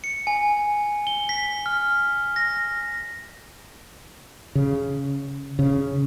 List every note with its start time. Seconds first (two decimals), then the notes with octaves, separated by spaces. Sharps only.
0.04 C#7
0.27 G#5
1.07 G7
1.29 B6
1.66 F6
2.36 A#6
4.55 C#3
5.59 C#3